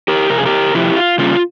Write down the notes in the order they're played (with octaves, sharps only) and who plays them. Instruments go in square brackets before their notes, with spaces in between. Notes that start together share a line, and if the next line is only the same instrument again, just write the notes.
[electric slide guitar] G4 A#4
F2 C3 F3 A#4
G#4
G4 A#4
F2 C3 F3 E4 G4
F4
C#3 G3 A#3 C#4 F4